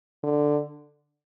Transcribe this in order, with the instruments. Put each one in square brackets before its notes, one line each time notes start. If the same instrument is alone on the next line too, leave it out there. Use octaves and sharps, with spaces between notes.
[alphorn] D3